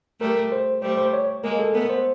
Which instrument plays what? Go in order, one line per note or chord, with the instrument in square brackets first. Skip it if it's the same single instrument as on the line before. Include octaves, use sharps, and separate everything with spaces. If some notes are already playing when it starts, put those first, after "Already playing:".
[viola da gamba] G3 A3 [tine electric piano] A#4
[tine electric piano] C5
[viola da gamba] G3 A3 [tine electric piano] C5
[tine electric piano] C5
C#5
[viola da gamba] G#3 A#3 [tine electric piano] A#4
[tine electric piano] A4
[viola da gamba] A3 B3 [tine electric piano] A#4
[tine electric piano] C5